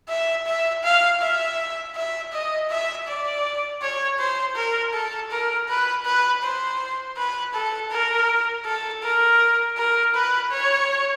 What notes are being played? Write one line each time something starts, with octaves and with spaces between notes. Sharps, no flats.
E5
E5
F5
E5
E5
D#5
E5
D5
C#5
C5
A#4
A4
A#4
B4
B4
C5
B4
A4
A#4
A4
A#4
A#4
B4
C#5